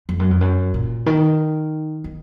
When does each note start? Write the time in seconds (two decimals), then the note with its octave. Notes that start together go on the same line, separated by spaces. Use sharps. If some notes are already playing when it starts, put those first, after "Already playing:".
0.09 F2
0.19 F#2
0.31 F2
0.41 F#2
0.74 A#2
1.06 D#3
2.04 D#3